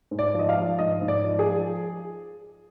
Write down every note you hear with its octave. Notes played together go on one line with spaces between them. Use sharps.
G#2
D5
F3 D#5
F5
F3
G#2 D#5
G#2
D5
F3
G#4
F3